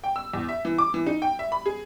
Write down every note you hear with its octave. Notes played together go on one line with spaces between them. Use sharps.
G5
E6
E2
E5
E3
D6
E3
D#4
G5
E5
B5
G#4